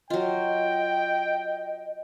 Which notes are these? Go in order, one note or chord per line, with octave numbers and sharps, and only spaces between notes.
F#3 F4 D#5 G5